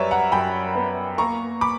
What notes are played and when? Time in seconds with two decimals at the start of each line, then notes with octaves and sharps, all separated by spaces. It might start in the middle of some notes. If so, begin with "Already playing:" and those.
Already playing: F#2 G3 A#4 B4 C#5 D5 E5
0.11 F#5 A#5
0.32 F#2 G5 B5
0.75 B3
1.18 A#3 A#5 C#6
1.61 B5 D6